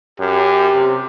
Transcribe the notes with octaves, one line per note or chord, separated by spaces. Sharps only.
F#2 G4
C3